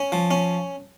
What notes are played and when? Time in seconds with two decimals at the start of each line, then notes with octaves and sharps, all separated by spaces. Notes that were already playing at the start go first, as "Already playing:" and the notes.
Already playing: C#4
0.12 F3
0.31 C#4